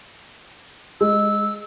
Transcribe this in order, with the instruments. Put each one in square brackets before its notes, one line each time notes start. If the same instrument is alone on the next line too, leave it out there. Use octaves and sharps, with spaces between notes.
[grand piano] G#3 [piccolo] E6